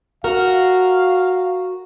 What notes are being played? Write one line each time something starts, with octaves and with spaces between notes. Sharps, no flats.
F#4 A#4 F5